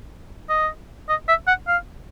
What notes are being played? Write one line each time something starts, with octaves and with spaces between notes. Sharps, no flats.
D#5
D#5
E5
F#5
F5